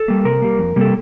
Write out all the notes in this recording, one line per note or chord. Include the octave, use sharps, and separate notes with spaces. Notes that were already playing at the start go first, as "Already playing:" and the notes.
Already playing: A4
G3 A#3
C3 A#4
G3 A#3
F2
C3 G3 A#3 A4